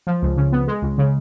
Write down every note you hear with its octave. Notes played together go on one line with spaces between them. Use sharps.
F3
C#2
C#3
B3
G#3
C#2
C#3